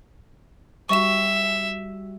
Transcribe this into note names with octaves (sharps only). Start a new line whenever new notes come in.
G3 F#4 E5 C#6 E7